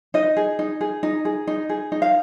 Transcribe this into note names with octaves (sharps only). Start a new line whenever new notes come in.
D#4 D#5
G#4
D#4
G#4
D#4
G#4
D#4
G#4
D#4
F5